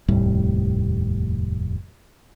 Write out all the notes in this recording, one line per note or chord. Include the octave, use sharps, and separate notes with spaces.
F1 D#2 A2 G3